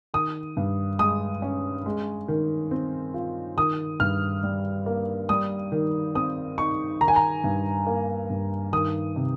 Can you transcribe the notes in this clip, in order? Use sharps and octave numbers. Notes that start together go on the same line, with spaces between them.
D#3 D#6
G2
G#3 D#6
C#4
G#3
D#3
C4
F4
D#3 D#6
G2 F6
G3
A#3
G3 D#6
D#3
C4 D#6
D#4 C#6
D#3 A#5
G#5
A#5
G2
A#3
G2
D#3 D#6
C3